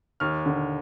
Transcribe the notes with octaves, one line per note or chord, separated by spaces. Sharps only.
D#2 F6
D3